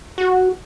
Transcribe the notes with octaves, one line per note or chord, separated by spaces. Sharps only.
F#4